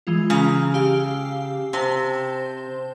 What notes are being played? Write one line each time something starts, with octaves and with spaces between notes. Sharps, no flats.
E3 G#3 F4
C#3 A#5 F6
G4 F5 E6
C3 C5 A5 C6